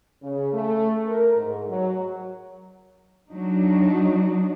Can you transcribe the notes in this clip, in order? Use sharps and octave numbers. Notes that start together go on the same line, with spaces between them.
C#3
A3
A#4
G#2
F#3
F#3 D4 D#4